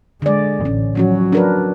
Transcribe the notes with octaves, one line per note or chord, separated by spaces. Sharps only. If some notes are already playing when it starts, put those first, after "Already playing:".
D3 G#3 D5
A1 C#4
F3 F#3 C#4 F#4
D4 A#4 B4